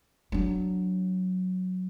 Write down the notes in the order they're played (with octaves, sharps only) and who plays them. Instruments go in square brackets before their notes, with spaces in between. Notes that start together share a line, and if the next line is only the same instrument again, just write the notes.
[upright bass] F#3 D4